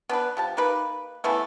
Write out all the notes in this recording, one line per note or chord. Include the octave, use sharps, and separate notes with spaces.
B3 D4 B4
F3 G4 A5
A#3 D#4 G4 B4
C#3 E3 A3 B3